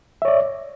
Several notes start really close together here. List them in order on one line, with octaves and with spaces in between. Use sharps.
E5 C#5 D5